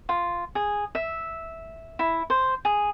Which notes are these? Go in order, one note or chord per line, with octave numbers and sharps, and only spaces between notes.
F4
G#4
E5
E4
C5
G#4